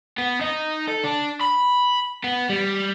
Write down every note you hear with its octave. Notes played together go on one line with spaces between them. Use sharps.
B3
D#4
A4
D4
B5
B3
G3